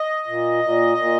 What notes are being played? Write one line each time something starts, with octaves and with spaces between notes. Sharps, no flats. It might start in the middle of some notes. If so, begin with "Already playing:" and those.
Already playing: D#5
A#2
A#2
A#2